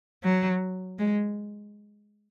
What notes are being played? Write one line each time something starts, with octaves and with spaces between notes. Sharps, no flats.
F#3
G#3